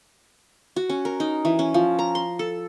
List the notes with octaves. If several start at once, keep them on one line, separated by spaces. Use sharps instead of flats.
F#4
C#4
A#4
D#4
E3
C#4
F3
A#5
C6
A4